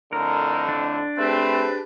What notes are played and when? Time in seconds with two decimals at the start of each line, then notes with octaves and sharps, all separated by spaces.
0.13 F2 A2 D3 A#4
0.69 D4
1.18 A3 C4 G4 G#4 B4